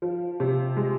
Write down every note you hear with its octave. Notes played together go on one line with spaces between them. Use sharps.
F3
C3
G#3